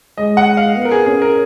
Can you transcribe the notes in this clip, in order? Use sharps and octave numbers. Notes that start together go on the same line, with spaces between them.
G#3 D#5
F#5
F5
B3
A#4
G#4
C#4 G#4
A#4